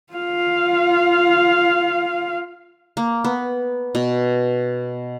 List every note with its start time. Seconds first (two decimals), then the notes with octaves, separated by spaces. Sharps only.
0.13 F4 F5
2.97 A#3
3.24 B3
3.95 B2